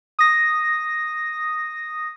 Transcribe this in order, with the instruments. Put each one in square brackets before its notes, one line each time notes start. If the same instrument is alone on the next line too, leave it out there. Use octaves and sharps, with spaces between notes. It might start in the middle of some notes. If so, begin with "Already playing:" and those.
[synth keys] D#6 A#6